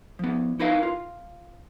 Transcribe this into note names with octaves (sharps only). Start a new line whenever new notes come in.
F3 B3
D#4 E4 A#4 B4 F5
F4